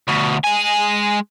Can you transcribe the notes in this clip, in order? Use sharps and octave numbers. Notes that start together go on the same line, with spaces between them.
D2 B2
G#3 G#5